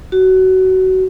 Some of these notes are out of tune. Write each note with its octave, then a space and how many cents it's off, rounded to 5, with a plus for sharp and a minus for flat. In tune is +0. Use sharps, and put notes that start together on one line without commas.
F#4 +20